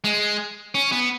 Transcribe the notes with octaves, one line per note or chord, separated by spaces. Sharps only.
G#3
C#4
B3